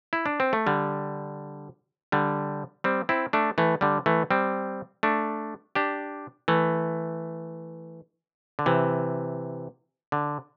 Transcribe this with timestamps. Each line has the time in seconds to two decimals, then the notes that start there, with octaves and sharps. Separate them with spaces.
0.13 E4
0.26 D4
0.40 C4
0.53 A3
0.67 D3 G3
2.12 D3 G3
2.84 G3 C4
3.09 C4 E4
3.33 A3 D4
3.58 E3 A3
3.81 D3 G3
4.06 E3 A3
4.31 G3 C4
5.03 A3 D4
5.75 D4 G4
6.48 E3 A3
8.59 D3
8.66 C3 E3
10.12 D3